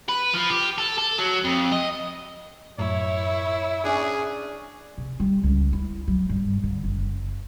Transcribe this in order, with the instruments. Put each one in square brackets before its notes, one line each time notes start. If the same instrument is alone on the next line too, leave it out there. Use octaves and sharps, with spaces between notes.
[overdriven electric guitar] B4
F3
G4
A4
A4
F#3
F2
D#5
[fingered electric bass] F#2 A2 [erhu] E4 [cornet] C#5
[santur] C#4 D4 [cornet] G#4
[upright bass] C3
G3
C#2
E4
F#3
G2
D3
F#1